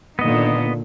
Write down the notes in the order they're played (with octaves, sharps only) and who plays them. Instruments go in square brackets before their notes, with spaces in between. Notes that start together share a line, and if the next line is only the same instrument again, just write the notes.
[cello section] A#2 D3 D#3 [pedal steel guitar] B3 D#5